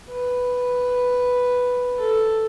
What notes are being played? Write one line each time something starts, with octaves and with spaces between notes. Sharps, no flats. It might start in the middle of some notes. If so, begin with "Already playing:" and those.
B4
A4